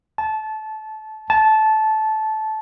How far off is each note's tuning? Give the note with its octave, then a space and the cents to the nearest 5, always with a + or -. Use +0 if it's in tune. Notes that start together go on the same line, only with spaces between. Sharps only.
A5 -20
A5 -15